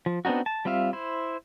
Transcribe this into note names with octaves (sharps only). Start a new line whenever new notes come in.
F3
B3 C4 D4 D#4 F#4
A5
G3 C4 F4 E5 F5
E4 C5